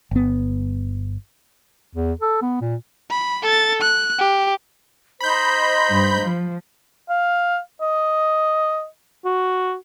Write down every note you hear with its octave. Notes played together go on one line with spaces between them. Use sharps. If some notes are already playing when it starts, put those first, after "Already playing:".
G1 B3
E2
A4
B3
A#2
B5
A4 A6
F#6
G4
D#4 C5 B5 G6
G2
F3
F5
D#5
F#4